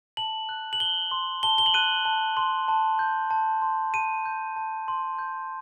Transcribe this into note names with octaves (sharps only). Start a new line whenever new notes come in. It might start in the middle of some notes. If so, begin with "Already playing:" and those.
A5 F#7
F#6
F#7
A5 G7
C6
A5 G7
G7
F#7
F#6 D#7
A5
C6
A5
G6
A5
C6
A5 D#7
G6
A5
C6
G6